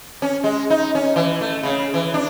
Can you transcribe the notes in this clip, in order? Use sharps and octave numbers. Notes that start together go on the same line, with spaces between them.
C#4
G#3
D#4
C#4
E3
A3
C#3
E3
D4